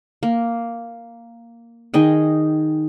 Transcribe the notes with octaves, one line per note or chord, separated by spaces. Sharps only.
A#3
D#3 G#4 D#5 G5